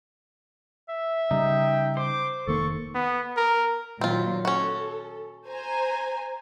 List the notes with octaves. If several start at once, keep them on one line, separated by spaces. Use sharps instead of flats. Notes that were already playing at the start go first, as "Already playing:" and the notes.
E5
C#3 G3 D#4 G5
C5 D6
F1 D#3 A#3 A4 C#6
B3
A#4
A#2 D#3 F#3 C4 F4
C#4 F#4 A4
C5 G#5 A#5